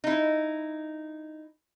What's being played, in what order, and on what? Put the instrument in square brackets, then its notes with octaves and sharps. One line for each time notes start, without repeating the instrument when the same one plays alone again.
[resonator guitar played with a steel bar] D#4 E4